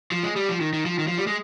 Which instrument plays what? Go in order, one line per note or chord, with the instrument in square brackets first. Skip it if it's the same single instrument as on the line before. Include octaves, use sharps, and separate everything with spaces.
[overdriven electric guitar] F3
G#3
G3
F3
D#3
D#3
F3
D#3
F3
G3
G#3